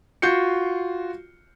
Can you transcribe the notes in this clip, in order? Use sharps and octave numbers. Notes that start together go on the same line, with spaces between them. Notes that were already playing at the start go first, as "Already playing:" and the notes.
F4 F#4 G6 C7 C#7